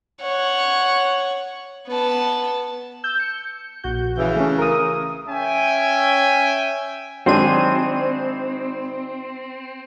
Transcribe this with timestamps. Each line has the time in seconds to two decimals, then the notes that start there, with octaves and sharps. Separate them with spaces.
0.23 C#5 F#5
1.89 B3 A5
3.04 E6 G6
3.20 C#7
3.83 A#1 F#4 G6
4.18 C#3 E3
4.36 A3 C#4
4.58 A#4 D#6
5.28 C#4 E5 G5 G#5
7.26 G#1 F#3 C4 D4 G#5 C6 D#7